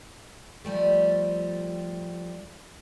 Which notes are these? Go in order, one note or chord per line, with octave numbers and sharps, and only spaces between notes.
F3 G3 A3